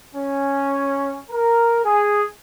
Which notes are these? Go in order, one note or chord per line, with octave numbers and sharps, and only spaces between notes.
C#4
A#4
G#4